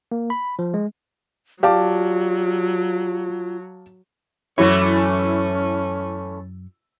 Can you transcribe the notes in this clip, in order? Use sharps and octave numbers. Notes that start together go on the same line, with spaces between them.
A#3
B5
F3
G#3
F#3 F4 G4 D5 F5 A5 D6
F#2 E3 A3 C#4 E4 C#5